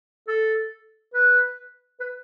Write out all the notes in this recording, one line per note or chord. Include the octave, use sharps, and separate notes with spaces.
A4
B4
B4